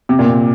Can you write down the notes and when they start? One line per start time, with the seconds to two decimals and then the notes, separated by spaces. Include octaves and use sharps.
0.09 C3
0.19 A#2
0.27 C3